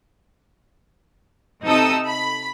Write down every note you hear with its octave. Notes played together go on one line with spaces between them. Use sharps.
C3 D#4 A4 D#6 E6
B5